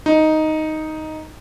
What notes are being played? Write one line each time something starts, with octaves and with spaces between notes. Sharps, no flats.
D#4